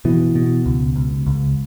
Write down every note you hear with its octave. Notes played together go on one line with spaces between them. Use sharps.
B2 E3
B2
C#2
C#2
C#2